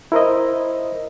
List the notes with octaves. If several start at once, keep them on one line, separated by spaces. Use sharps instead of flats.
E4 A#4 C5 D#5